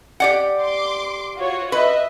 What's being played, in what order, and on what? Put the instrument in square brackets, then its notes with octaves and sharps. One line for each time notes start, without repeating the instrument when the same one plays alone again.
[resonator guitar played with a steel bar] G4 D5 F#5
[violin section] C6 D6
F4 F#4 C#5
[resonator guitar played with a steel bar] B4 [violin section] D#5 E5